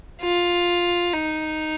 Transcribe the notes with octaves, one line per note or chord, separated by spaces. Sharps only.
F4
D#4